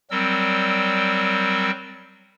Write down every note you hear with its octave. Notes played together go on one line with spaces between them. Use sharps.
F#3 G3 C4 A#4 E6